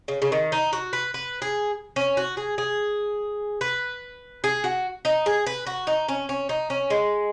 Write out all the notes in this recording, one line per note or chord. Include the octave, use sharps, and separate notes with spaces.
C#3
C#3
D#3
D#4
F#4
B4
B4
G#4
C#4
F#4
G#4
G#4
B4
G#4
F#4
D#4
G#4
B4
F#4
D#4
C#4
C#4
D#4
C#4
G#3